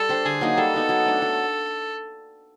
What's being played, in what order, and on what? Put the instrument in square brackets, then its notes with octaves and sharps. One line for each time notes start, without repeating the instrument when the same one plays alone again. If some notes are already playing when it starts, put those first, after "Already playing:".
Already playing: [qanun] G3 [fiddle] A4
[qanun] D4 G4 C5
[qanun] D3 [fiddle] G#4
[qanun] F#3 A#3 D#4
[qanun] G3 [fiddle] A4
[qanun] B3 D#4 F#4
F#3
A3 D4
F#3